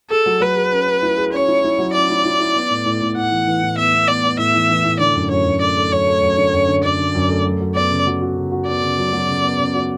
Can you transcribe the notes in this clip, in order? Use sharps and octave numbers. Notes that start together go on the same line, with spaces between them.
G#4 A4
F#3
F#3 B4
G#4
C#4
C#4
E4
G#4
C#4 C#5
E4
E4
F#3
C#4 D5
E4
E4
E4
B3
A2
A2
A2
A2 F#5
E3
E3
A2
B3 E5
B3
B3 D5
B3
A2 E5
E3
E3
A2
D3 D5
F#2
F#2 C#5
F#2
A3 D5
A3
F#2 C#5
A3
F#2
D3
F#2
D3
F#2 D5
D3
F#2
A3
F#3
F#3
B3 D5
C#3
F#3
F#4
C#3
F#4
B3 D5
C#3
F#3
F#3
C#3
B3
C#3
F#4